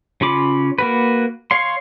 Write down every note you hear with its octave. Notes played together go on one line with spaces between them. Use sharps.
C#3 C#4 F4 B5 D6
A#3 F#4 B4
C#5 F5 C6